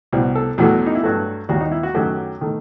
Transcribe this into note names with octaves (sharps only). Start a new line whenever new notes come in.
C2 B2 G3
A4
E2 B2 F#3 A3 G4
D#4
E4
G2 F#3 A3 F#4
D#2 D#3 G3 F#4
D#4
E4
F#4
F#2 D#3 F#3 A3 G4
D#3 A3